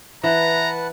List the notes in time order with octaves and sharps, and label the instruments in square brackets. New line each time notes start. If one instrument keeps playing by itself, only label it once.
[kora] E3 [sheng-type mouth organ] B4 F#5 A5 [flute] E5 [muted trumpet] A#5